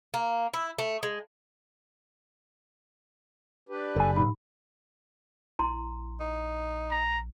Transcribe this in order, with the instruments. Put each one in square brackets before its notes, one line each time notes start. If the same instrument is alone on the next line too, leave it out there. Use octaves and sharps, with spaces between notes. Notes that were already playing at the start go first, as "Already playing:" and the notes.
[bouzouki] A#3
E4
A3
G#3
[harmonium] D4 G4 B4
[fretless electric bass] F#1 [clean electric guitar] A4 G#5
[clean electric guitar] B1 [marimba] A2 D#4 B5
[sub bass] A#1 [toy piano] E4 A#5 C6
[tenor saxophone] D#4
[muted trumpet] A#5